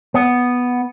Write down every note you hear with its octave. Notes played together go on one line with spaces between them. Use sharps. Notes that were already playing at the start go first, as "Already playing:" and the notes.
B3